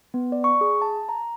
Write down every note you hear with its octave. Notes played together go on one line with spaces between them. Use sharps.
B3
D5
C#6
G#4
A5
A#5